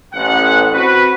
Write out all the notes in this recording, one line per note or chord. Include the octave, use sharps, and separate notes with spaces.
A1 F#5
C4 F#4 B4